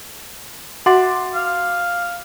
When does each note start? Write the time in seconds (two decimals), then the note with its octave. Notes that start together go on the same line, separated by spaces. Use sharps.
0.86 F#4 E5 F#5 C6 D6 A6
1.35 F5